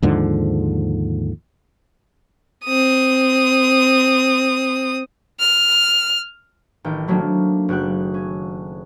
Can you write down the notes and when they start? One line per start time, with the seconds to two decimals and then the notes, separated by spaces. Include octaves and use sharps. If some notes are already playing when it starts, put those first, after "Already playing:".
0.02 D#2 G#2 D3 F3
2.65 C4 D#6
5.39 F6
6.85 A1 D#3 G5
7.08 D#3 F#3 A3 A#3 C4 D4
7.69 F#1 F#4 G5 F#6
8.14 C#4